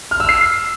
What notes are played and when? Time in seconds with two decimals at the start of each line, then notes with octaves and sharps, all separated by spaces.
0.11 F6
0.20 E6
0.29 C7